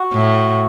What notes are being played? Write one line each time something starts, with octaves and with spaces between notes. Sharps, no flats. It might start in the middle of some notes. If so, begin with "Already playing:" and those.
Already playing: F#4
A2